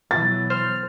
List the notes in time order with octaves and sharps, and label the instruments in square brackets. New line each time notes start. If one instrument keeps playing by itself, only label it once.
[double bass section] B2 E3 F#3 [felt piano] A6
[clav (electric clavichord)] C5 [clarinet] F6